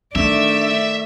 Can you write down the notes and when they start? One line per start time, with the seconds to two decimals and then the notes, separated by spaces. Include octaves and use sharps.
0.15 D#3 A3 D4 D5 E5